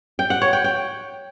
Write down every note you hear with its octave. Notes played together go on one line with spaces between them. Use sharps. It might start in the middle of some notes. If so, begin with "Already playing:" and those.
G5
F#5
C#5
G5
G5